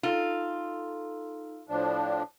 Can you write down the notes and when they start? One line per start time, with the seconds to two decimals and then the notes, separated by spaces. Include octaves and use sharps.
0.03 D#4 F4 A4
1.69 A2 F3 D4